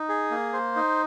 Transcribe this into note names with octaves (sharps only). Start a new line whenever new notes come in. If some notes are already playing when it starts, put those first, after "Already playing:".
Already playing: D#4
G#4
A#3
C5
D#4